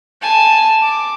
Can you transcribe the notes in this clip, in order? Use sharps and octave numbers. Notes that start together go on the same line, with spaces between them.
G#5 A5
D6